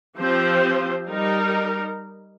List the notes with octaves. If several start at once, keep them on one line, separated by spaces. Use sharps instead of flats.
F3 C4 G4 C5
G3 D#4 A#4